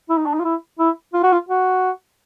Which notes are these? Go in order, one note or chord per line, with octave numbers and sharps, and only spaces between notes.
E4
D#4
D4
D#4
F4
E4
E4
F4
F#4
F4
F#4